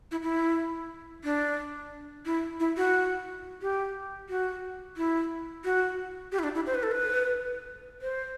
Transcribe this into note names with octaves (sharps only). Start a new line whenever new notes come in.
E4
E4
D4
E4
E4
F#4
G4
F#4
E4
F#4
G4
E4
D4
E4
C5
B4
A4
B4
C5